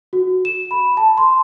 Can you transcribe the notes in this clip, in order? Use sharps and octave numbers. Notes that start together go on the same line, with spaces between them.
F#4
E7
B5
A5
C6